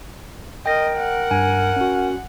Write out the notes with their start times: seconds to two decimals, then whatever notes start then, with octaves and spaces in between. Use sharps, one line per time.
0.66 A#4 D#5 G5 A#6
0.98 F#5
1.31 G2 G#5
1.76 C#4 F#4